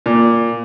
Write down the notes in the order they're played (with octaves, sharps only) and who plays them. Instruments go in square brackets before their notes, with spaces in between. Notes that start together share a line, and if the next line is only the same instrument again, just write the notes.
[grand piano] A#2